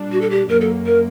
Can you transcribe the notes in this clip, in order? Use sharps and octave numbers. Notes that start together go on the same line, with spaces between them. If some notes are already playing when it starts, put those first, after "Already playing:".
Already playing: A#2 G3 D4
F#4
A4
G4
F#2 F#3 A#3 A#4
A4
A#4